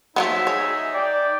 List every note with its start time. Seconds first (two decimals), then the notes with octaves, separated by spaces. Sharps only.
0.16 F3 F#3 B3 D#4 E5
0.47 G#4 C#5
0.93 D5 G5